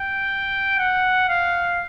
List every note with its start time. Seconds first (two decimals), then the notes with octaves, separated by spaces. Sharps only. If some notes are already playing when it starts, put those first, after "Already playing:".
Already playing: G5
0.78 F#5
1.28 F5